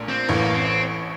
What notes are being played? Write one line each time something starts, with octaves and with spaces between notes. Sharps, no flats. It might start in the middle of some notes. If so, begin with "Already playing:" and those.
Already playing: A#1 A#2 A3
C4
A1 A2 E3 A#3
C4